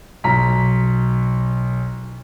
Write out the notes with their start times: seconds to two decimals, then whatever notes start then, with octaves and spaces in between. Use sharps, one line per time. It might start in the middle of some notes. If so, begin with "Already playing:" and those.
0.24 B1 A#5 B6